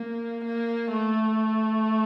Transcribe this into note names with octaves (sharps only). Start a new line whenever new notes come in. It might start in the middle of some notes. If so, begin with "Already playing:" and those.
Already playing: A#3
A#3
A3